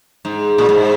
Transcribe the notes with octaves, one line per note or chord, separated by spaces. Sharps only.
G#2
A#2
G#2